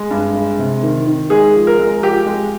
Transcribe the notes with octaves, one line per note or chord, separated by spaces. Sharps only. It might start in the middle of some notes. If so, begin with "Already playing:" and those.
Already playing: G#3
G2
G#3
C3
D#3
D#3
G#3 G#4
F3
A#4
G#3
F3 G4
G#3